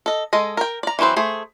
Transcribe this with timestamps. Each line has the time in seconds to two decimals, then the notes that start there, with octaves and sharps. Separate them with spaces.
0.06 A4 D#5
0.33 G#3 A4 D#5
0.57 A#4 G5
0.83 D5 A#5
0.99 E3 F#3 C4 B4 C5
1.16 A3 G#4 C5